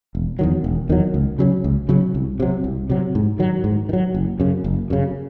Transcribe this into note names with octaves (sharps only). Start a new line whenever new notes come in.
E1
E2 D#3 F#3
E1
E2 D#3 F#3
C#2
C#3 F#3 C#4
C#2
C#3 F#3 C#4
C2
C3 F#3
C2
C3 F#3
G#2
D#3 F#3
G#2
D#3
F#3
F#1
F#2 C#3
F#1
F#2 C#3